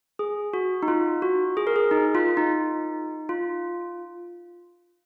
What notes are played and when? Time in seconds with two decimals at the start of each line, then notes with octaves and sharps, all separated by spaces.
0.19 G#4
0.53 F#4
0.83 D#4
0.88 F4
1.22 F#4
1.57 G#4
1.67 A#4
1.76 G#4
1.91 D#4
2.15 F4
2.37 D#4
3.29 F4